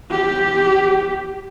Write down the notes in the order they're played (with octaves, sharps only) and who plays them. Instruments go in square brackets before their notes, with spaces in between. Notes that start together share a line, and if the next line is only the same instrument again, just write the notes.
[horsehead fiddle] G4